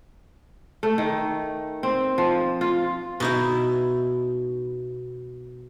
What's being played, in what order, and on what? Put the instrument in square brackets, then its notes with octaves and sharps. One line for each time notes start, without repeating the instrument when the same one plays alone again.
[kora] A3
D#3
C4
F3
F4
[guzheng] B2 D#4 E4